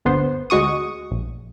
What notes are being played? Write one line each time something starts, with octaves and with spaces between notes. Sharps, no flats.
G1 D2 B3 C5
D2 G#3 F#4 C#6 D#6
A#1